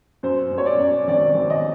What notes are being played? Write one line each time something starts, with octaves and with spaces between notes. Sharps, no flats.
F#2 C5
F#2
C#5
D5
F#2
G#1 D5
G#1
D#5